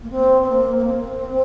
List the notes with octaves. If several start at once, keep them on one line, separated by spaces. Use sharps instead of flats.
A#3
C4
C4
A#3
A#3
C4